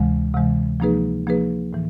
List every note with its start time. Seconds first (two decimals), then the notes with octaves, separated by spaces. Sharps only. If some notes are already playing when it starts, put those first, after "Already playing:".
Already playing: D2 C3 E3 G#3
0.34 D2 C3 E3 G#3
0.80 F3 A#3 D#4 G#4 B4
1.27 F3 A#3 D#4 G#4 B4
1.73 A2 E3